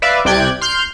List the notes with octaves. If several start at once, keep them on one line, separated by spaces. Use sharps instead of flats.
B4 D5 E5 F5
C2 C3 D5 G5 F#6 G#6
C6 F6 G6